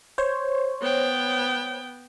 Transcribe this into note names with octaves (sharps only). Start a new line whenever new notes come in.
C5 C#5
B3 G5